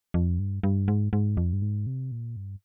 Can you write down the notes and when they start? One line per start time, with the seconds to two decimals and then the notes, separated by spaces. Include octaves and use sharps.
0.14 F2
0.39 G2
0.63 G2
0.88 G#2
1.13 G#2
1.37 F2
1.53 G2
1.62 G#2
1.87 C3
2.12 A#2
2.36 G2